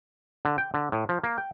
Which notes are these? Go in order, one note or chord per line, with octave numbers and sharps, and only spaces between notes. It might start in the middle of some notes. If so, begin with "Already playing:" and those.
D3
G5
D3
A2
F3
A#3
G5